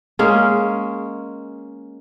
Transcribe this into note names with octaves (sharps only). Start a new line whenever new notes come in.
G#3 A#3 C#4